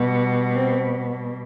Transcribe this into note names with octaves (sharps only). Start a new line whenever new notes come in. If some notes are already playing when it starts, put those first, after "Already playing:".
Already playing: B2 G3
C4